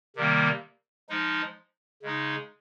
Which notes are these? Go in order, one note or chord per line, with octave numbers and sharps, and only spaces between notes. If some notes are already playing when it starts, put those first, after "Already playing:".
C3 D#3 G3 A#3
F3 G#3 D#4
C#3 G#3 D#4